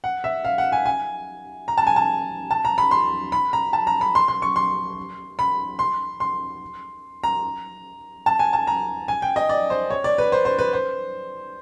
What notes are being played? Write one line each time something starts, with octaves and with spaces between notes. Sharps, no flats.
F#5
E5
F5
F#5
G#5
G#5
A#5
A5
G#5
A5
A5
A#5
B5
C6
B5
A#5
A5
A#5
B5
C6
C6
C#6
C6
B5
C6
C6
A#5
A5
G#5
A5
A#5
G#5
G5
D#5
D5
C5
C#5
D5
B4
C5
C5
B4
C5